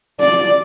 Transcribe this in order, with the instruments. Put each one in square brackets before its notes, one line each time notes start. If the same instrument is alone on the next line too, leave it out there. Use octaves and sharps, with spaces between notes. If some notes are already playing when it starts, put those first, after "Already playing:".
[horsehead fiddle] D5